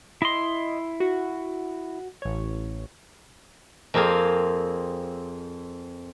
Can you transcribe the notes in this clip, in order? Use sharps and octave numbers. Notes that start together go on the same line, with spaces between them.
E4 D#5 C6
F#4
A1 C#5
F2 A#3 C4 G#4 F5